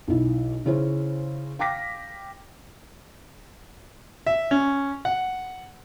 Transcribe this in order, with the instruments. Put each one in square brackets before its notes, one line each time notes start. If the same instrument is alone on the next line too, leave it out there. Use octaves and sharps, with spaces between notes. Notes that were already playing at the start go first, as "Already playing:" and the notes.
[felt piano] B1 E4
C#3 C#4 E4 C5
F5 G5 D6 A#6 B6
[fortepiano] E5
C#4
F#5